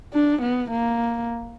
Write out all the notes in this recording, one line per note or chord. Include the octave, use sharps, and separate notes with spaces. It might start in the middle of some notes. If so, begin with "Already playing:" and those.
D4
B3
A#3